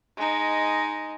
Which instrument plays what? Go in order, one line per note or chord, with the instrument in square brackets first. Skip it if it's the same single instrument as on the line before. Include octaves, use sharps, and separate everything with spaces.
[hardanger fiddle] G#3 D#4